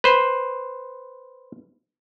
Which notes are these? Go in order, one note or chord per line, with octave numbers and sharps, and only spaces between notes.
B4 C5